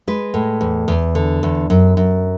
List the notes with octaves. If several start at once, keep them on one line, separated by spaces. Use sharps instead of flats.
G#3 B4
A2
E2
E2
D3
E2
F#2
F#2